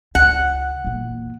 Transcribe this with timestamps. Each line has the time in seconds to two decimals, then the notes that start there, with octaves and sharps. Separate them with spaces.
0.15 C#2 F#5
0.84 E2 A#2